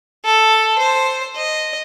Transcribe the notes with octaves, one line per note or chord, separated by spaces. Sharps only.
A4
C5
D#5